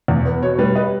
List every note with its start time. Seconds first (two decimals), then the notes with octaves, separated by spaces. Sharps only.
0.08 E2
0.26 B3
0.42 B2 C#5
0.59 G3 B4
0.76 B4 D#5